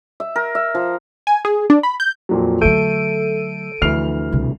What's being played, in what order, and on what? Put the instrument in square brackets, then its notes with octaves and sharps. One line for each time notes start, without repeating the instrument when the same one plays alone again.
[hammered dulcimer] E5
A#4
E5
F3
[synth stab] G#5
G#4
D4
B5
G6
[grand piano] F2 A#2 F#3
[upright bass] D3 F#3 [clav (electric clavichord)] A3 [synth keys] A4 D7 D#7 [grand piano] G6
[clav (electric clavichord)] D2 E3 [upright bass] F3 D4 [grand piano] F6 C7 F7
[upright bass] C2 B2